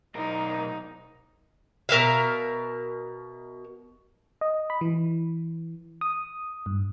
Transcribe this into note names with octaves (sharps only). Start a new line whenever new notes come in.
B1 D#4 A#4
B2 A#4 E5 F5
D#5
B5
E3
D#6
G2